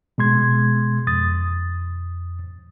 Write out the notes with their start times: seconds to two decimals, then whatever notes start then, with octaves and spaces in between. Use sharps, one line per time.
0.18 B2 G#3 C6 G#6
1.07 F2 D#6 A6